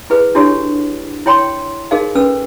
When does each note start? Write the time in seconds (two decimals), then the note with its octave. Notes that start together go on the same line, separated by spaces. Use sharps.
0.10 E4 G#4 B4
0.35 D4 E4 F#4 G4 A4 C#5
1.26 E4 C#5 G5 B5 C6
1.91 D#4 G#4 A#4 C5 D#5 F5
2.15 C#4 A4 B4 E6